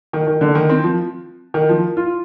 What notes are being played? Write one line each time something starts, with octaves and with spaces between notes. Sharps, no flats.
D#3
D#3
D3
D#3
C4
F3
D#3
F3
F4